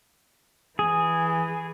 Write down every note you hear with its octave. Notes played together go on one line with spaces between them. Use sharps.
E3 G#4